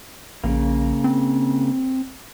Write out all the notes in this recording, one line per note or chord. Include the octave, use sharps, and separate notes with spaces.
A#1 C#3 A#3
C4